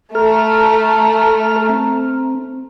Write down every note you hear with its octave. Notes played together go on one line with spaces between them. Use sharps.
A3 A4 A#5 F6
C4